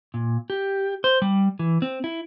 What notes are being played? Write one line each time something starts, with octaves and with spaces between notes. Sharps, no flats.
A#2
G4
C5
G3
E3
C4
E4